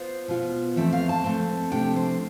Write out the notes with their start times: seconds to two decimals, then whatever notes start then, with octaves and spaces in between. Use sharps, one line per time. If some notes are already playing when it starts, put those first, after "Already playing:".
Already playing: B3 F4 C5
0.28 B2 B3 F4
0.76 F2 E3 A3 C4 E5
0.92 F5
1.09 A5
1.24 F2 E3 A3 C4
1.72 C3 F3 A3 D4 G5
1.96 C5